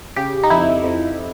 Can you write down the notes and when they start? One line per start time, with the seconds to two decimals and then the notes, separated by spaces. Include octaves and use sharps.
0.16 C#3 G4
0.43 D#4
0.50 F2 E4
0.84 F2